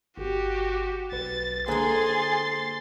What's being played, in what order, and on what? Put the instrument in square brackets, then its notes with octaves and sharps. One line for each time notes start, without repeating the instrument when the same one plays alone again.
[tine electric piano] G1 [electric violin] F#4 G4
[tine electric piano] B1 B4 [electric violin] A6
[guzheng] D3 G#3 [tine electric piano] A#3 C5 A#5 [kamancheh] G#4 [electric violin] C6 A6